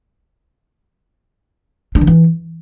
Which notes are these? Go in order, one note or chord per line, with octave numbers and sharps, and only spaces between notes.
D4
D#3
E3